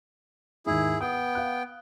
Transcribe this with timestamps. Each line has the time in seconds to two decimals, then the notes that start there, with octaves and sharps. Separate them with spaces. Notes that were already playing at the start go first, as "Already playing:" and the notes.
0.66 D#2 G#2 E4 G#4
1.01 B3 G5 D#6
1.35 F5 F#6